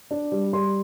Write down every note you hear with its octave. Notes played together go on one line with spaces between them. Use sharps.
D4
G3
G3 C6